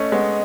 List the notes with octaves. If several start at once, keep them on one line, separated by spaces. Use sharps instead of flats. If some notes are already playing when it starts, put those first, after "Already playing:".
Already playing: A3 C#4 D#5
G#3 B3